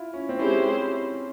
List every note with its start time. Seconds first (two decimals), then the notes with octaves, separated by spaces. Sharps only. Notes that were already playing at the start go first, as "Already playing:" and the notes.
Already playing: E4 F4
0.14 C#4
0.29 C4
0.39 G#3 C#4 E4 G4 C5